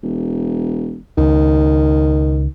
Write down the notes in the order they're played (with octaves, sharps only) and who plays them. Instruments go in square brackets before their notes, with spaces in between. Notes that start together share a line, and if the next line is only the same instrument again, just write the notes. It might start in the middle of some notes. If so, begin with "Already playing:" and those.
[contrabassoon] E1
[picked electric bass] C#2 [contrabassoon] D#3